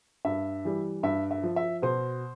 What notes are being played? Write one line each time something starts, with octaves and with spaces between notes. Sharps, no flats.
G2 E5
E3 G3
G2 E5
E5
F3
E5
B2 C5